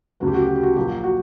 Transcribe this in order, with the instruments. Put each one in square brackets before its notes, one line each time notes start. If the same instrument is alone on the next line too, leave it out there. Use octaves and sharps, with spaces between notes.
[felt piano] D2 C#3 F#3 B3 F#4
G4
F#4
G4
F#4
G4
F#4
A#1 A#2 F#3 G4
F#4